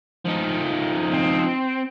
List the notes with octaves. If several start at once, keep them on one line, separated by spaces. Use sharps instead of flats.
F3 D#4
C4